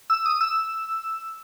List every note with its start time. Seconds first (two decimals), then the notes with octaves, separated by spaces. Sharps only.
0.10 E6
0.26 D#6
0.41 E6